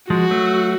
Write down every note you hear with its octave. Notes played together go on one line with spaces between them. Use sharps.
F3 G#3 F#4
F#3 A3